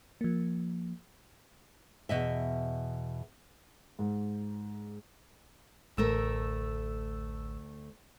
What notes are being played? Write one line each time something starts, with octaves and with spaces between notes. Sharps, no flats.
F3 A#3
E2 B2 D#5 E5
G#2
A1 D2 A3 A#4 E6